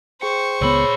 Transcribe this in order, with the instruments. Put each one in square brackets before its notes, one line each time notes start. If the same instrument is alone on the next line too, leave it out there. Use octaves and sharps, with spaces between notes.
[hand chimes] G#4 G5 C#7 [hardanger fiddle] C5 C#6
[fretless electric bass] C#2 G3 B3 [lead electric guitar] A#2 B5 [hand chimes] G#4 C#5 E6